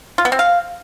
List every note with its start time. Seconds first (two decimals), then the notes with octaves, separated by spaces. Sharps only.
0.18 F4
0.25 B3
0.32 C4
0.39 F5